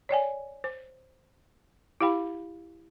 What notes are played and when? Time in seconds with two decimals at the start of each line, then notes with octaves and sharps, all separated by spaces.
0.09 C#5 D5 G5 G#5
0.64 C5
2.01 E4 G4 F5 G5 B5